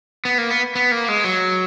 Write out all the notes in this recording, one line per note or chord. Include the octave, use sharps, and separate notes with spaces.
B3
A#3
B3
B3
A#3
G#3
F#3